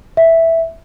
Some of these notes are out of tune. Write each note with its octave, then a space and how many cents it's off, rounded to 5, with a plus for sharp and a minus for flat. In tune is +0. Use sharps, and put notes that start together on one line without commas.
E5 +0